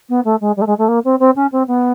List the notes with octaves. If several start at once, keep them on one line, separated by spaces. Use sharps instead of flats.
B3
A3
G#3
G3
A3
G#3
A3
A#3
C4
C4
C#4
C4
B3